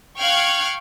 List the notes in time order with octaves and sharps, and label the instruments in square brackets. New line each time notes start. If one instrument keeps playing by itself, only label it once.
[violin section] F5 G5 C#6 F6 F#6 G#6